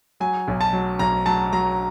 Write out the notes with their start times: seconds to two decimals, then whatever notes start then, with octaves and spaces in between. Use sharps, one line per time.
0.20 F#3 G#5
0.48 B1
0.61 A5
0.73 F#3
0.99 B1 A#5
1.26 F#3 A5
1.53 F#3 A#5